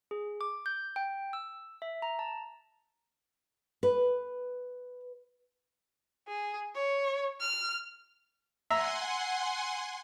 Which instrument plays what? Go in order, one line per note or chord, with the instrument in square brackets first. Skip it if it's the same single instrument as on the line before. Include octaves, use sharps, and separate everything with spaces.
[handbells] G#4
D6
G6
G5
E6
E5
A#5
A5
[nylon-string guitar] B4
[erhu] G#4
C#5
F6
[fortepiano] E5 A#5 [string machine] F#5 G#5 C6